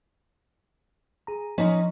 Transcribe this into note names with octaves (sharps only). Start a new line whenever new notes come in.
G#4 A#5
F3 C#4 D#4 A#5